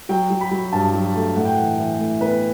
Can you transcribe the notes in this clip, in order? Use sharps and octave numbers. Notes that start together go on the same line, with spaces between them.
F#3 G5
F#3
B5
F#3
G2 A5
F#3
A3
A2 F#5
G5
E3 F#5
E3
A2
B3 B4